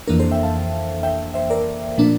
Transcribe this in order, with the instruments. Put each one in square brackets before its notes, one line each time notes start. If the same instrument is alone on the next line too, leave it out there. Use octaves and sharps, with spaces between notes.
[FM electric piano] F2 E3 A#3 D4 A#4
A4 C5
E5 G5
F5 A5
E5 G5
C5 E5
A#4 D5
A#2 F3 A#3 D4